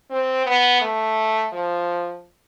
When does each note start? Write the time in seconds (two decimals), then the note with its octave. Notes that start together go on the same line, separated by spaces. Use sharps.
0.10 C4
0.46 B3
0.81 A3
1.52 F3